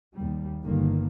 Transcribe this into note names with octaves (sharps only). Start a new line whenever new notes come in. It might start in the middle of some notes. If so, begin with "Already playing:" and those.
D#2 G3
G1 G2 D3 D#3 A#3